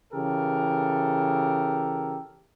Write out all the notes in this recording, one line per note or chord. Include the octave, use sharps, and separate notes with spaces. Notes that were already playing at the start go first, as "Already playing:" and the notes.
C#3 E3 G4 A4 A#4